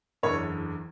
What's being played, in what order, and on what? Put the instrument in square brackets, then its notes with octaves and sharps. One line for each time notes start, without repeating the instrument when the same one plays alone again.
[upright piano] F#1 E2 D3 C#5